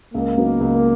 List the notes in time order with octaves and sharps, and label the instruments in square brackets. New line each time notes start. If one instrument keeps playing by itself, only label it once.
[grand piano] C#2 [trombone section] A#3
[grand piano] C#3 F#3 B3 D#4
C#2